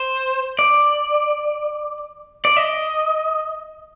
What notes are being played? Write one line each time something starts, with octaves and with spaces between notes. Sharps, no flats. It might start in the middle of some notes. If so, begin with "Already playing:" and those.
Already playing: C5
D5
D5
D#5